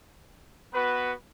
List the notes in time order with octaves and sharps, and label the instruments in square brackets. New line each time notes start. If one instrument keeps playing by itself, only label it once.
[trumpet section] B3 F#4 B4